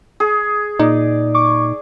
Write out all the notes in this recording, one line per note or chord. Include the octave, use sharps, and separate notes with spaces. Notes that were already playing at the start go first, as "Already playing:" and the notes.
G#4
A#2 D#4 D5
C#6 D6